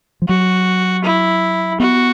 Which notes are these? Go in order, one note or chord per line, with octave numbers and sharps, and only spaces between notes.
F3
F#3 F#4
E4
B3 F#4